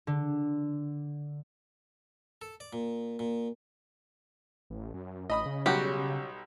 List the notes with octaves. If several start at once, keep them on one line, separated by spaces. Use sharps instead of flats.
D3
A4
D5
A#2
A#2
A1
F#2
A1 D#5 B5 D#6
C#3
B1 F#3 G3 F#4 G4